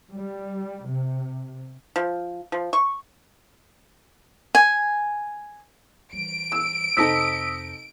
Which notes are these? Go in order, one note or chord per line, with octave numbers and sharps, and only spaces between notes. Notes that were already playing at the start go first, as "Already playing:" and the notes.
G3
C3
F3
F3
C#6
G#5
E3 G3 D7
E6
F2 C3 C4 D#4 A4 D#6 E6 B6